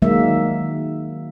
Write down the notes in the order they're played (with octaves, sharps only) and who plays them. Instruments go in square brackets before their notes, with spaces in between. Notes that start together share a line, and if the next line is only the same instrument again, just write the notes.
[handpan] D#3 F#3 G#3 A#3 E5